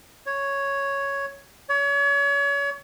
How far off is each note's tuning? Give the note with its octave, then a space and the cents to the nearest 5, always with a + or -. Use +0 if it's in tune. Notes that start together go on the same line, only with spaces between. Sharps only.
C#5 +0
C#5 +35